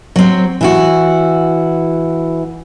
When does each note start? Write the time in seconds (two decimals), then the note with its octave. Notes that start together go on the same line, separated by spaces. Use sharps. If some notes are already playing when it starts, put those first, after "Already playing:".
0.16 F#3 C4
0.61 E3 E4 F#4